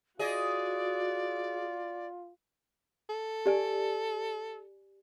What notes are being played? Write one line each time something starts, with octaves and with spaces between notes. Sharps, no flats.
F4 F#4 G#4 D5 D#5
A4
G4 D5 G#5